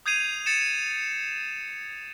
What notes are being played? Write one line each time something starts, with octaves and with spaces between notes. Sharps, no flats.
D#6 G6 G#6 C7 D#7 F7
A6 C#7 E7